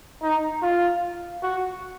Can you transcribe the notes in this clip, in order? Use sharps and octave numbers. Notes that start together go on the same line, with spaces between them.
D#4
F4
F#4